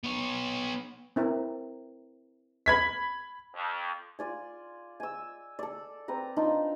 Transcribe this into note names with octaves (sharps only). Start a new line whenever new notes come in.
B3 C#5
C4 E4 A#4
B5 G#6 B6
F2
F4 D5 G#5
G#5 E6
A4 D5
C4 B4 A#5
D4 D#4 F4